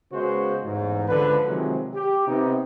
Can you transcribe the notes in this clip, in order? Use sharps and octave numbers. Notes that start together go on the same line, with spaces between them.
C#3 G#3 B3 F#4 C5
A1 E2 G#2
C#2 D3 F3 B4
C3 D#3 F3 F#3 G#3
G4
C3 B3 D#4